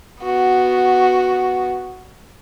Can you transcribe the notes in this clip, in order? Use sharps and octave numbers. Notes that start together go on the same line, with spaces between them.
B3 F#4